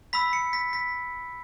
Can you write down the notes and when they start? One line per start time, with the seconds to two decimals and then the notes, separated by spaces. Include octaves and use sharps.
0.13 B5 E6 B6
0.33 C#7
0.53 B6
0.73 B6